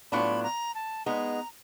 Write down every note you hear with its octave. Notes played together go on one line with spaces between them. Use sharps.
A2 F#3 B3 D4 F4 B5
A#5
A5
G#3 B3 D#4 A#5